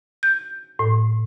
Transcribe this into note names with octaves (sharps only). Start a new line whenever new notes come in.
G6
A2